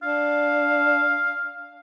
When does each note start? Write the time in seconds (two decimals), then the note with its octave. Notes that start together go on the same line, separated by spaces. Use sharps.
0.03 D4 F5